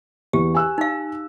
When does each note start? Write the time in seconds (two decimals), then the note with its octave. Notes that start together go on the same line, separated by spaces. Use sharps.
0.33 E2 G4
0.54 G#5 E6 F#6
0.78 D#4 F5